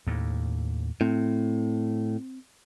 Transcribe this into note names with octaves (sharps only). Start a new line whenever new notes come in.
D#2 A2
A2 C4